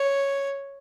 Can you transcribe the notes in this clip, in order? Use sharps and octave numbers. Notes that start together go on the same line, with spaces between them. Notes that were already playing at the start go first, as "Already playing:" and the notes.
Already playing: C#5